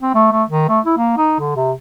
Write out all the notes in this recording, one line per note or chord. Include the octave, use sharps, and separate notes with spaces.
C4
A3
A3
D#3
A3
E4
A#3
D#4
D3
C3